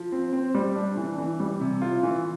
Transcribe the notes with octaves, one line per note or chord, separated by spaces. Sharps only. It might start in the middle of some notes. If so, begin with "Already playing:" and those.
Already playing: F3
C4
C4
G3
D4
E3
E3
G3
C3
F4
E3